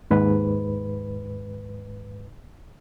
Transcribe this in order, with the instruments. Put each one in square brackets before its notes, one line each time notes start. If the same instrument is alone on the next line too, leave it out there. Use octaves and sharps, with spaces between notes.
[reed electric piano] D#2 G#2 B4